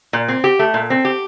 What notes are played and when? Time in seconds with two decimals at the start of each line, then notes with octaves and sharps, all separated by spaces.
0.13 A#2
0.28 C4
0.44 G4
0.59 A3
0.74 A#2
0.90 C4
1.05 G4